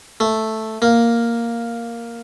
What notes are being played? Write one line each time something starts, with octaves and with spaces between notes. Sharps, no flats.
A3
A#3